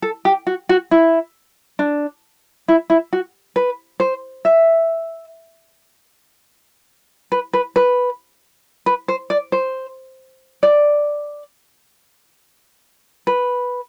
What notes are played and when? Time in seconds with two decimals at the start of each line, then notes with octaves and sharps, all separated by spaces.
0.02 A4
0.25 G4
0.47 F#4
0.69 F#4
0.91 E4
1.79 D4
2.68 E4
2.90 E4
3.13 F#4
3.56 B4
4.00 C5
4.45 E5
7.32 B4
7.53 B4
7.76 B4
8.86 B4
9.08 C5
9.30 D5
9.52 C5
10.63 D5
13.27 B4